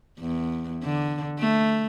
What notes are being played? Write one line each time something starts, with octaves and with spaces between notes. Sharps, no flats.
E2
D3
A3